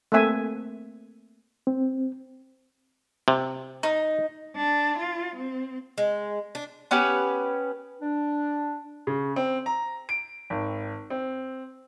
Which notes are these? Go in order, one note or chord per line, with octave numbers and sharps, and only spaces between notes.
A3 A#3 C4 E5 G#5
C4
C3
D#4
D4
F4
C4
G#3
D4
B3 C#4 G4 B4
D4
C#3
C4
A#5
D7
G#1
C4